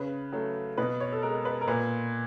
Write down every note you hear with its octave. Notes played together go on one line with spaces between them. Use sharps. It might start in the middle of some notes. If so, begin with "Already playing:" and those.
Already playing: C#3 B4
F#3 A3
B2 B4
C#5
A4
G#3 A#4
B4
A#4
A#2 B4